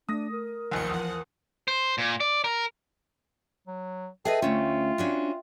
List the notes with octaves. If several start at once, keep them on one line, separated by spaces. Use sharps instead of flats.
A3 D4 D#6 A#6
A#4
F1 A#1 D#2 F3 D#5 G#5 C6 C#7
E2 F3 F#5 D#6
C5
A#2
D5
A#4
F#3
G#4 A4 B4 D#5 E5 G5
D2 A3 C#4 F4
C#4 D4 F#4